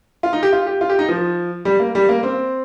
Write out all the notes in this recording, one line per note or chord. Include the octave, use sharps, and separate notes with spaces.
F4
D#4
G4
F4
G4
F4
G4
D#4
F3
G3
A#3
G3
A#3
C4